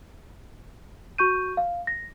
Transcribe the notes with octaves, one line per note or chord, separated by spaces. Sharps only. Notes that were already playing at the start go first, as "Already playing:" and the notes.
F#4 C#6 G6 D#7
F5
A#6